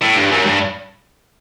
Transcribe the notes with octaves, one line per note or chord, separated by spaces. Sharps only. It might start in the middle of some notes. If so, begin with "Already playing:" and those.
A2
G2
F#2
G2